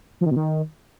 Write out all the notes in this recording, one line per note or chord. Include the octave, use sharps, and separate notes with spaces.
F3
D#3
B2
D#3